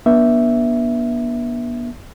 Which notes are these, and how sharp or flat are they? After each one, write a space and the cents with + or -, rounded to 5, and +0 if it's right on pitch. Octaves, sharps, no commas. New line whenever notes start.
B3 -40 D4 +0 E5 +0